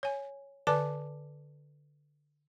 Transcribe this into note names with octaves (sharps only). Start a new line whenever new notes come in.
C#5 G#5
D3 B4 D5 A5 D6